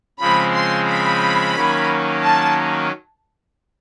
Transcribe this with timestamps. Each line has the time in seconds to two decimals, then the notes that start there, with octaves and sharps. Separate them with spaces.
0.20 C#3 F3 G#3 C4 B5
0.54 C6
0.88 B5
1.55 D#3 F#3 A#3 C#4
2.24 A5